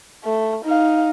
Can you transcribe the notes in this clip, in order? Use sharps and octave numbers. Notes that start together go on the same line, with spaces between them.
A3
D#4 F5